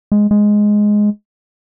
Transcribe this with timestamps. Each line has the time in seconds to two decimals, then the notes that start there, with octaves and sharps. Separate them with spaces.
0.12 G#3
0.31 G#3